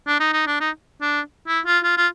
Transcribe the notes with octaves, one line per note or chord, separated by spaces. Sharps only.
D4
D#4
D#4
D4
D#4
D4
E4
F4
F4
F4